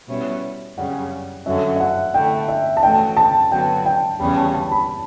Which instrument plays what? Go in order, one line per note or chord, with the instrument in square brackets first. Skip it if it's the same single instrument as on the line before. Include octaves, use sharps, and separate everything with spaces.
[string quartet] B2 G3 C#4 E4
[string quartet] F#2 C#3 G3 C#4 [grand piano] F#5
[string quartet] F#2 D3 F#3 C#4 [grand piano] E5
[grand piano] E5
F#5
[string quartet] D3 A3 E4 [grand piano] G5
[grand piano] E5
A5
[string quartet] E3 A3 C#4 F#4 [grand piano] G5
[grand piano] A5
[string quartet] D3 F#3 B3 F#4 [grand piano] G5
[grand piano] G5
[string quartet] E2 C#3 G3 C#4 [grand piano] B5
[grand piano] A5
A5
B5